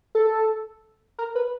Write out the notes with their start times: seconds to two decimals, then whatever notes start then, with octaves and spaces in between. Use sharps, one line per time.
0.15 A4
1.18 A#4
1.35 B4